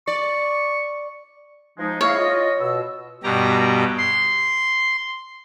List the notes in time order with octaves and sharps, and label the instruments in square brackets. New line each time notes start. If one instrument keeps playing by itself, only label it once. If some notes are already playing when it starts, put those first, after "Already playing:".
[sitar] D5 [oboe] C#6
[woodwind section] F3 G#3 D#4
[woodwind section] E4 G#4 F5 [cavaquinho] C#5
[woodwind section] F4 D#5
B2 E6
[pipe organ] G2 B2 G4 A#5
C6